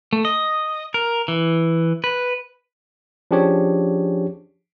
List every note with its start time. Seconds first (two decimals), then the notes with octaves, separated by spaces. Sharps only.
0.13 A3
0.25 D#5
0.94 A#4
1.28 E3
2.04 B4
3.31 F3 C#4 D4 G4 G#4 C#5